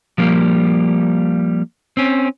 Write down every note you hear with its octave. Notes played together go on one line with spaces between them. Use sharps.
F3 G3 A#3
C4 C#4